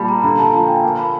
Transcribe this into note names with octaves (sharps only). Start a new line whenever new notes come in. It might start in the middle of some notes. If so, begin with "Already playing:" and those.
Already playing: A#2 G3 A5 B5
A#5
D3 A#5
A5
F3 G#5
G5
A#3 A5
B5